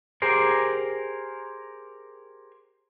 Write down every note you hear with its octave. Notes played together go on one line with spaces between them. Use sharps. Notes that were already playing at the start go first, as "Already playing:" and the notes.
G4 G#4 A#4 C5